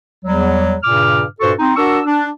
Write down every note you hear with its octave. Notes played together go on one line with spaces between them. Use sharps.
E2 F#3 G3
G2 A#2 C#3 D6 F6
G2 A#2 F#4 A4 C5 C#6
C4 D#4
D4 F#4 A#4 C#6 E6
D4